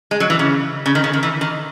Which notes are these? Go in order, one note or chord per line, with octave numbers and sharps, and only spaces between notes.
G#3
F#3
E3
C#3
C#3
D#3
C#3
D#3
E3
D#3